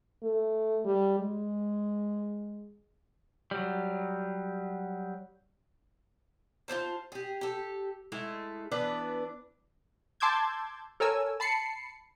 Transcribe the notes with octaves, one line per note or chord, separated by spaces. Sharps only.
A3
G3
G#3
F#3 G3
F4 G#4 C5 A5
G4 G#4
G4 A4
G#3 A3 E4 D#5
E3 B3 D4 B4
A5 C6 D6 E6 G6 G#6
A4 A#4 C#5 G#5 E6
A5 B5 C7 C#7